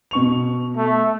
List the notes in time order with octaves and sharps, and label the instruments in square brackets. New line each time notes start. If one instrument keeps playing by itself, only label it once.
[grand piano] B2 C#6 F7
[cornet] A3